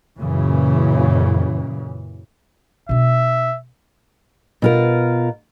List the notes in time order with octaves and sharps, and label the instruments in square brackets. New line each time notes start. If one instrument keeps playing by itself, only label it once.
[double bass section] F#2 A#2 C#3 E3
[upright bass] B2 D4 [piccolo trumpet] E5
[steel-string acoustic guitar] B2 F4 A#4